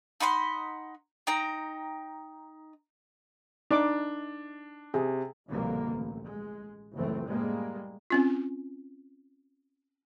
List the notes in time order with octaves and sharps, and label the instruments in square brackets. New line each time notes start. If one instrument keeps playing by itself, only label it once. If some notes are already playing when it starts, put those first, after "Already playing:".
[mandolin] D#4 F#5 B5 C6
D#4 G5 A#5
[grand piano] D4 [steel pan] D#4 D5 D6
[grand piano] C3 [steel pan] G#4
[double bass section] G1 C2 F2 B2 D3 A#3
A1
G#3
F#1 C#2 F#2 E3 A3 C4
A2 G3 G#3 A#3
[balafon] C4 C#4 F4